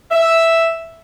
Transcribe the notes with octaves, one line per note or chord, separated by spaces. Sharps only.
E5